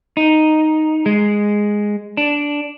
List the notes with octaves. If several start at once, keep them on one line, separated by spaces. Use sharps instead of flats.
D#4
G#3
D4